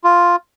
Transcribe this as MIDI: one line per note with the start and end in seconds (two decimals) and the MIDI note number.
0.04 0.36 65